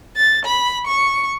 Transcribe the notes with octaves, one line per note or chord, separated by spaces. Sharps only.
A6
B5
C#6